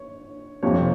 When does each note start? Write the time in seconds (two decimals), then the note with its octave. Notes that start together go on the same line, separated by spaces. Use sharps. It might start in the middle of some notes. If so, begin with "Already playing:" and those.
Already playing: C#5
0.63 F2 C3 F3 C#5